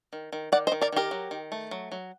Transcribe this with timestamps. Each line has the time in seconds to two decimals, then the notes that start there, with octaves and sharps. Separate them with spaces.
0.13 D#3
0.33 D#3
0.52 D#3 D5 F#5
0.67 C5 D#5
0.72 D#3
0.82 A#4 D5
0.92 D#3 G4 A#4
1.11 F#3
1.31 D#3
1.52 A3
1.71 F#3
1.92 F#3